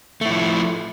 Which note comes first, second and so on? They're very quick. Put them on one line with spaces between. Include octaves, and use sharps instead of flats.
A3 E4 F3